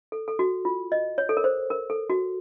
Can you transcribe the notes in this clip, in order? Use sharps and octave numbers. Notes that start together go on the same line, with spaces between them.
A4
A4
F#4
F4
D#5
C#5
A4
A#4
C5
A#4
A4
F#4